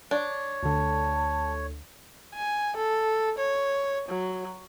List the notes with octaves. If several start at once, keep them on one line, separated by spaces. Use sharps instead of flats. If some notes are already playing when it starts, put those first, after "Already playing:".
D4 C#5
D2 D3 A5
G#5
A4
C#5
F#3